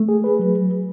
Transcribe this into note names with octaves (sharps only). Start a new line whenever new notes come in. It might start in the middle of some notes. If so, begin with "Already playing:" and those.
Already playing: A3
G#4
B4
F#3